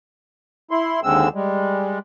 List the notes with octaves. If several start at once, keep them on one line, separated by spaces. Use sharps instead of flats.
E4 C6
D#2 D3 G#3 C4 E6
G3 G#3